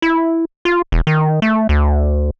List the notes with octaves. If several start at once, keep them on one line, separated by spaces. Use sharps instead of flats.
E4
F4
E1
D#3
A3
D2